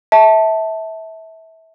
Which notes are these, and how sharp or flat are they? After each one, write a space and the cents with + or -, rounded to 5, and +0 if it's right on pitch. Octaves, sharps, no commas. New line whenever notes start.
E5 -25 A5 +0